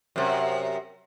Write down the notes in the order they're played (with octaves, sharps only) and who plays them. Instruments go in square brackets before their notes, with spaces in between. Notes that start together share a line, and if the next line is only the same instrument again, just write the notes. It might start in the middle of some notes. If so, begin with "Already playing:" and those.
[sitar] F#2 C3